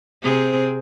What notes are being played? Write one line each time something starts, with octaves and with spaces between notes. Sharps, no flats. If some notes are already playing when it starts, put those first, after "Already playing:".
C3 C4 G#4